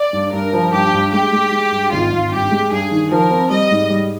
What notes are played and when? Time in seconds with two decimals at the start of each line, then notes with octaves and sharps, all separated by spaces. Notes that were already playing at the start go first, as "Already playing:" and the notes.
Already playing: D5
0.13 G2
0.32 G2 A#4
0.53 F3
0.73 G2 G4
0.93 G2
1.12 G#3 G4
1.32 G#3
1.52 G#3
1.71 G2
1.91 G#1 F4
2.12 G#1
2.31 G2 G4
2.51 G#3
2.71 G2 G#4
2.91 D#3
3.11 F3 A#4
3.31 C4
3.50 G3 D#5
3.71 G#2
3.90 G3